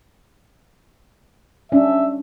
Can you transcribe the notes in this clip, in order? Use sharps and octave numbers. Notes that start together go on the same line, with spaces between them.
C#4 D4 E5